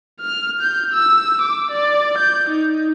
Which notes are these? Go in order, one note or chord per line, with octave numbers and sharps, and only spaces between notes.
F6
G6
E6
D6
D5
G6
D#4